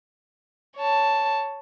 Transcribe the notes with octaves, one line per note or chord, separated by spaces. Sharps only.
C#5 A5